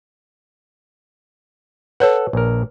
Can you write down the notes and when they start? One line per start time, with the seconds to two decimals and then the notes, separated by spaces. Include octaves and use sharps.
2.00 A4 B4 C#5 F#5
2.33 A#1 A#4